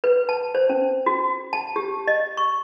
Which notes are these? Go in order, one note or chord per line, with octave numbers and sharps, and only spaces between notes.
B4
A5
C5
C#4
F#4
A5
G4
D#5
C#6